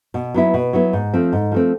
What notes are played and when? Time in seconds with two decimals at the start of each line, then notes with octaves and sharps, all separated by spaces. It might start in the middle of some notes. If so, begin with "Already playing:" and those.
0.14 B2
0.34 F#3 B3 E4
0.54 B2
0.73 F#3 B3 E4
0.93 G#2
1.13 F3 A3 C4
1.33 G#2
1.52 F3 A3 C4